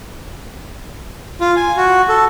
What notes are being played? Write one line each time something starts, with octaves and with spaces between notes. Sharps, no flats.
F4
G#5
F#4
A4